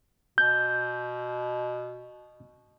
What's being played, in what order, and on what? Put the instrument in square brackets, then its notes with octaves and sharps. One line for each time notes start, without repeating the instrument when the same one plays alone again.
[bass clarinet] B2 [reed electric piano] G6